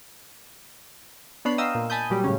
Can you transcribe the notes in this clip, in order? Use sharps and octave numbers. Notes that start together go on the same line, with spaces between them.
B3 D4 C#5 B5 C7
D#5 F5 G5 A#5 D#6 E6
A#2
G#5 A5 B5 D#6 G6
A#2 F#3 G3
A2 C#3 C#4